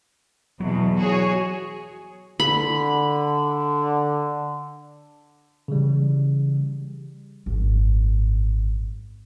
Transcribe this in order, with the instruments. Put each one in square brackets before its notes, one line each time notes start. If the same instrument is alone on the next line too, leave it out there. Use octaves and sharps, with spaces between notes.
[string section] E2 B2 [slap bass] F#3
[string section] F#4 G#4 C#5
[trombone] D3 [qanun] B5
[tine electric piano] C#3 E3 G3
[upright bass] G#1 F#2